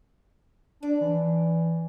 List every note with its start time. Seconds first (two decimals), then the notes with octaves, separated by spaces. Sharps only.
0.83 D4 D5
1.01 E3